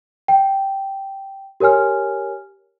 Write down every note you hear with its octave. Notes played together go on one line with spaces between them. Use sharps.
G5
G4 A#4 C#5 G#5 F6